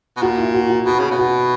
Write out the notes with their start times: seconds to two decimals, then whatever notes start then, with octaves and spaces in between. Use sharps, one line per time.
0.17 B2
0.22 A#2 F#4
0.38 E4
0.54 F#4
0.70 F#4
0.86 B2 F#4
0.99 C#3
1.11 B2
1.19 F#4